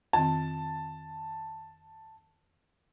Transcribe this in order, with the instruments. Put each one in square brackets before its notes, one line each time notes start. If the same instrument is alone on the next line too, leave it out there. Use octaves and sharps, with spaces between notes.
[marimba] F2 D#3 C4 [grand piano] A5